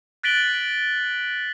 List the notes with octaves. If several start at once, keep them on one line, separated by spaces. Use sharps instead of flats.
F#6 A6 B6 D7 F#7 G7